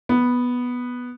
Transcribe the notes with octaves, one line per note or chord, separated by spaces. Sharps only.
B3